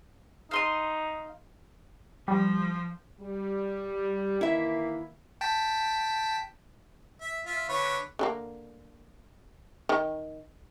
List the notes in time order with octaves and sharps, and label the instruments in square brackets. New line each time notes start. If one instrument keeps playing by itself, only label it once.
[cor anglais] D#4 [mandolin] F5 C6 D#6
[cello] F3 [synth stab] G3
[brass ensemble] G3
[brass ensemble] D#3 E3 A#3 [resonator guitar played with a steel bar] E4 E5
[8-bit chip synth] G5 A5 B6
[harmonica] E5
F4 E5
D3 B4 C#5
[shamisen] D3 A3 A#3
D#3